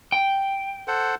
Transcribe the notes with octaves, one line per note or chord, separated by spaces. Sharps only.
G5
A4 C5 F#5